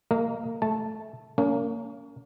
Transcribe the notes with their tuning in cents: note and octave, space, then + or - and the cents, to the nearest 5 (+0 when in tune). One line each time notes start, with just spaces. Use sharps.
A#3 -30 A#4 +0 D#5 +0
A3 -10 A5 +0
A#3 -20 C#4 +30